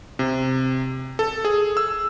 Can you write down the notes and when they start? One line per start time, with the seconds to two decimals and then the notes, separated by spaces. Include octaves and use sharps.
0.19 C3
1.19 A4
1.45 G#4
1.77 E6